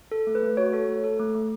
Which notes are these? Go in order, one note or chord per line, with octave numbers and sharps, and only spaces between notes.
A4
A3
B4
A3
F#4 C#5
A4
A3
A4
A3
A3